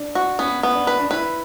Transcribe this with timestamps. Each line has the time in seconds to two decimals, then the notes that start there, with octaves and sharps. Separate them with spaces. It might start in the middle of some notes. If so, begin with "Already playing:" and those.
Already playing: D4
0.15 F#4
0.39 B3 C#4
0.63 B3
0.75 D4
0.87 B4
0.99 D4
1.11 E4 B4